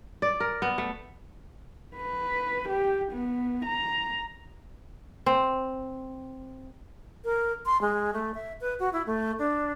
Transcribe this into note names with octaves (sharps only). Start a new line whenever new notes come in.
D5
A#4
B3
A3
B4
G4
B3
A#5
C4
A#4
C6
G#3
A3
E5
B4
F#4
E4
A3
D4